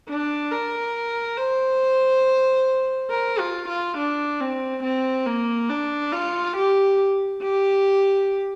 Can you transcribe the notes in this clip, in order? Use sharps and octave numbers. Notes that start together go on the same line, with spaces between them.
D4
A#4
C5
A#4
F4
F4
D4
C4
C4
A#3
D4
F4
G4
G4